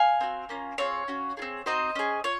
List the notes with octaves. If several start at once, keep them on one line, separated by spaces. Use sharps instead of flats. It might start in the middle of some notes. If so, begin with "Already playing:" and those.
Already playing: F5 G#5
C4 F#4
A#3 C#4 F4
C4 F4 G#4 C#5 F5
C#4 F#4
C4 F4 G#4
C4 D#4 F#4 C5 D#5
C#4 G#4
F4 C#5